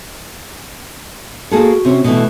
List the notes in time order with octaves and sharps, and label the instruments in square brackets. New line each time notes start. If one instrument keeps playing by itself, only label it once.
[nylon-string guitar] A#3 G#4 A4 [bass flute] F#4
[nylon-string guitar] C3 C4 C#4
[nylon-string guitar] B2 E3 [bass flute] A3